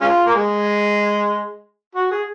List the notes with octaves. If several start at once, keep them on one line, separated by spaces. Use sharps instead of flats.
G#3 C#4 F4
A#3
G#3
F#4
G#4